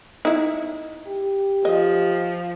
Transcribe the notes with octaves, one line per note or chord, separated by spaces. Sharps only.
D#4 E4
G4
F3 D#5